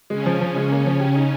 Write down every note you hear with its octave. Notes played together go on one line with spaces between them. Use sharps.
C#3 G#3 C#4
F3
F3
G#3
A#3
F3
G4
D#4